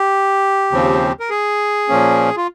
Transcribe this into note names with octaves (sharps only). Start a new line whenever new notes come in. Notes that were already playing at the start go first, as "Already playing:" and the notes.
Already playing: G4
D#2 C#3 F3 C4
A#4
G#4
A#2 F3 A#3 C#4
F4